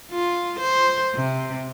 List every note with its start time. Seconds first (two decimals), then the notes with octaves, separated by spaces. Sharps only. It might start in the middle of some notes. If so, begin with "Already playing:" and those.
0.12 F4
0.60 C5
1.15 C3